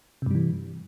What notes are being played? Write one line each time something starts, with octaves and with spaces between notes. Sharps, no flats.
G2 C3 E3 G3